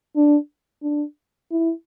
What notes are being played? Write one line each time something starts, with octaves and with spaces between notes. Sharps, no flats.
D4
D4
E4